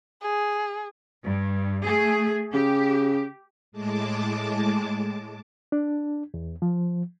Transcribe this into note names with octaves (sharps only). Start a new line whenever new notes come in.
G#4
G2
A3 G#4
C#3 G4
A2 G#3 A5 D6
D4
E2
F3